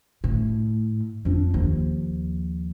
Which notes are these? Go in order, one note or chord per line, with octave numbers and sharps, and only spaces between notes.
A2
F2 D4
D#2 F3